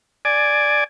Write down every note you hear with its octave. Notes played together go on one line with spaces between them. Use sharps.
D5 G#5